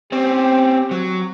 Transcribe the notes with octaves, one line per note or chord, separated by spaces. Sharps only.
C4 C#4 G4
F#3